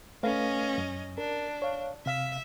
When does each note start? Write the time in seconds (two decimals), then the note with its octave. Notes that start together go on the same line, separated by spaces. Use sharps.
0.23 A3 C#4 B4 D#5 F5
0.78 F#2
1.18 D4 A#4
1.62 C#5 F5
2.06 C3 E5 F5